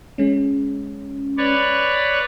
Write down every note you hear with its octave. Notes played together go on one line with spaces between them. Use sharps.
G#3 C#4
B4 C#5 D5